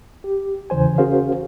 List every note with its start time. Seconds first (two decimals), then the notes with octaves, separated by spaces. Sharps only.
0.24 G4
0.70 E2 C#3 E3 C5 G#5
0.98 C#4 F#4 G#4 A#4 C5 F5